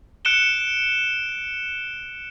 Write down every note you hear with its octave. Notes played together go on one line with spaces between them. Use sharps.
F#6 C#7 D7 E7 G7